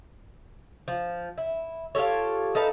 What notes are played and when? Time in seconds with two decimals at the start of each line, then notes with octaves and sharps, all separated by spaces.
0.88 F3
1.38 E4
1.95 F4 G4 A4 C#5
2.55 D#4 A4 B4 F5